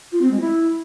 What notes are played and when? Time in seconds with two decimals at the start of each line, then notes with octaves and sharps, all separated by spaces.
0.12 F4
0.21 C4
0.31 G#3
0.40 E4